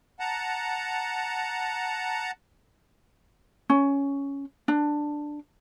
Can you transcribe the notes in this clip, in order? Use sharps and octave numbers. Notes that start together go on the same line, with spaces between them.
F#5 A5 A#5
C#4
D4